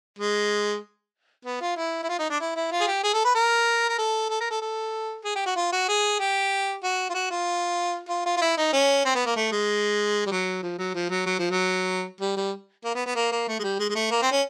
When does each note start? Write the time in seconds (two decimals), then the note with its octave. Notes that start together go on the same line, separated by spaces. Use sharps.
0.19 G#3
1.45 B3
1.61 F4
1.77 E4
2.03 E4
2.09 F4
2.19 D#4
2.30 D4
2.40 E4
2.56 E4
2.72 F4
2.81 G#4
2.87 G4
3.03 G#4
3.14 A4
3.25 B4
3.35 A#4
3.89 A#4
3.98 A4
4.30 A4
4.40 A#4
4.51 A4
4.62 A4
5.25 G#4
5.35 G4
5.46 F#4
5.56 F4
5.72 F#4
5.88 G#4
6.20 G4
6.84 F#4
7.10 F4
7.14 F#4
7.31 F4
8.09 F4
8.26 F4
8.37 F4
8.42 E4
8.57 D#4
8.73 C#4
9.05 C4
9.15 B3
9.26 A#3
9.36 A3
9.52 G#3
10.26 G3
10.31 F#3
10.63 F3
10.79 F#3
10.95 F3
11.10 F#3
11.26 F#3
11.39 F3
11.51 F#3
12.20 G3
12.37 G3
12.84 A#3
12.95 B3
13.06 B3
13.16 A#3
13.32 A#3
13.48 A3
13.59 G#3
13.63 G3
13.79 G#3
13.90 G#3
13.95 A3
14.11 A#3
14.22 C4
14.32 C#4